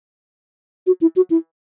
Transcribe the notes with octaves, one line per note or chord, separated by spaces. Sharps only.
F#4
E4
F#4
E4